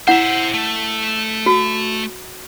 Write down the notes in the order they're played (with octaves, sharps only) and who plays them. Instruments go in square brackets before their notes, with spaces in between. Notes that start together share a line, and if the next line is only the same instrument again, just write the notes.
[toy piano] E4 F#5 [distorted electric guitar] C5 E5
[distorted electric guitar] A3
[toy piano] F#4